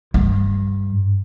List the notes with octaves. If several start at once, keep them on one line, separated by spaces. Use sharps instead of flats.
G2